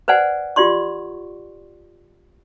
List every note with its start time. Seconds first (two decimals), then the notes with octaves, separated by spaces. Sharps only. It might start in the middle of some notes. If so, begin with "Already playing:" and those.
0.08 B4 C5 D5 F#5 G#5
0.56 F4 G4 D5 C6 C#6